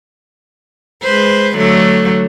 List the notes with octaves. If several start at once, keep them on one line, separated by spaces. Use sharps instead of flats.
G#3 B4 C5
D3 F#3 A3